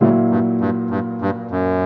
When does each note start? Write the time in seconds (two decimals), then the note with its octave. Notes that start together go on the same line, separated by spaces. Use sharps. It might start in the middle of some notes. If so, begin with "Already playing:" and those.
0.01 A#2 C#3 F#3 A#3 E4
0.30 G2
0.61 G2
0.90 G2
1.21 G2
1.51 F#2